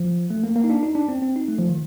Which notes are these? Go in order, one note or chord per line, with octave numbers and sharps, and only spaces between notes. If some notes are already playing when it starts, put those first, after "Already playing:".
Already playing: F3
A3
A#3
A#3
D#4
D4
D#4
D4
C4
C4
D#4
A3
F3
D#3